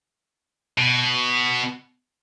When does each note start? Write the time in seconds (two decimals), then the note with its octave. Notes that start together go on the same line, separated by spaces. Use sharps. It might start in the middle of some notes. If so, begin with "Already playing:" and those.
0.78 B2